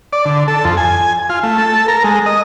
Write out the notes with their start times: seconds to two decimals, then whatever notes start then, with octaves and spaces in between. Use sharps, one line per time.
0.13 D5
0.25 D3
0.48 A4
0.65 F2
0.77 G#5
1.30 F4
1.43 A3
1.58 A4
1.88 A#4
2.04 G#3
2.26 D#5